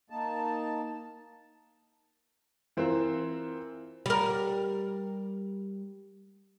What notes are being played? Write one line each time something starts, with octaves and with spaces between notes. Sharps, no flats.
A#3 D#4 A5
E3 C4 F4 A#4 C5
G3 A#4